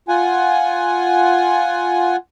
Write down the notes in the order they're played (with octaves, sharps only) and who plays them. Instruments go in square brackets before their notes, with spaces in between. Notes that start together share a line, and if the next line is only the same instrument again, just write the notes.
[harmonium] F4 F#5 G#5